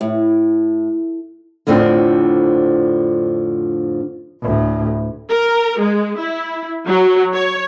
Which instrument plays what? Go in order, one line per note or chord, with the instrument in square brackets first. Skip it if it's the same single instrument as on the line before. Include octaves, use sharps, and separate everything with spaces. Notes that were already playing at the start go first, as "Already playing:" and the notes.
[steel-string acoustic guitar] A2
[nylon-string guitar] F2 A2 D3 F3 C4 D4
[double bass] D2 A2
[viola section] A#4
G#3
E4
F#3
C#5